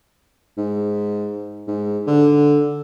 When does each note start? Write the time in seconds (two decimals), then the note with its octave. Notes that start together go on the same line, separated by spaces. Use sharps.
0.57 G#2
1.68 G#2
2.07 D3